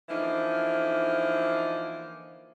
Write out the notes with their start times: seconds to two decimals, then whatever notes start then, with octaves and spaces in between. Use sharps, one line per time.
0.08 D3 E3 F3 A#3 D#4